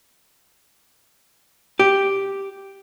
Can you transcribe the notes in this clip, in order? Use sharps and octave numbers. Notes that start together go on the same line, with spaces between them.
G4